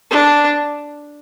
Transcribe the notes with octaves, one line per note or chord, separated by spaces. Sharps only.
D4